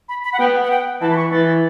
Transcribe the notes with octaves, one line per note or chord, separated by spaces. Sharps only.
B5
B5
F#5
B3 G5
F#5
G5
E3 A5
B5
C#6
E3 A6